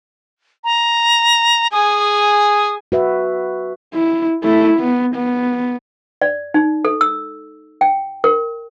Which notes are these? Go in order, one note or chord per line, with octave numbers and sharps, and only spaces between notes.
A#5
G#4 G#5 D#6
F#4 B4 E5
E4
A3 E4
B3
B3
D5
D#4
A4
E6
G5
A#4